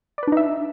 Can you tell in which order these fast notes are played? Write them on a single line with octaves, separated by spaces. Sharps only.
D5 B4 D4 D#4 E5